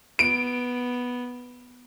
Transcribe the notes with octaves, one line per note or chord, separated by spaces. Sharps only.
B3 D7